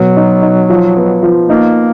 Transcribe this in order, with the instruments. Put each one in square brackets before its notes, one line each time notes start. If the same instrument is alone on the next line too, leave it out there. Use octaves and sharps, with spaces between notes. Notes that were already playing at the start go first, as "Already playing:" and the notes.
Already playing: [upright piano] B2 [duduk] F#3
[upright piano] D#4
D#4
F3
B3
F3
[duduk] A#3 [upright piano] D#4